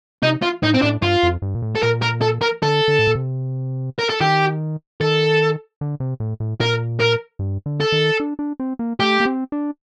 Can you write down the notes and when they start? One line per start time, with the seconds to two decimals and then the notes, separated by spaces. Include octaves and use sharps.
0.22 C3 D#4
0.42 F4
0.63 A2 D#4
0.74 C4
0.82 A2 D4
1.02 G2 F4
1.23 F2
1.42 G2
1.55 A#2
1.62 A2
1.75 A4
1.83 A#2 A#4
2.02 A#4
2.21 A4
2.41 A#4
2.63 D3 A4
2.88 D3
2.99 A2
3.07 A#2
3.15 C3
3.99 A#4
4.10 A4
4.21 D#3 G4
5.00 D#3 A4
5.81 D3
6.00 C3
6.20 A2
6.40 A2
6.60 A#2 A#4
7.00 A#4
7.39 G2
7.66 D3
7.80 A4
7.92 D#3
8.20 D4
8.39 D4
8.60 C4
8.79 A#3
8.99 A3 G4
9.20 A#3
9.25 C4
9.52 D4